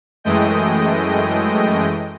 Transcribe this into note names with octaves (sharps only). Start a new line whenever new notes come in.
F#2 E3 G#3 A3 D#5 G5